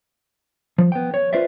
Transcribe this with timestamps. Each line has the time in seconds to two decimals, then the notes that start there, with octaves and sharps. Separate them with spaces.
0.78 F3
0.92 B3 G5
1.14 C#5
1.33 F4 B4 C5 D5 E5